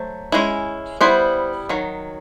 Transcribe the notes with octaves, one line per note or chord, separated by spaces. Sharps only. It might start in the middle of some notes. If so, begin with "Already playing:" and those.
Already playing: F#3 A3 C5
G#3 C#4 E4
G3 B3 E4 C5
D#3 F#3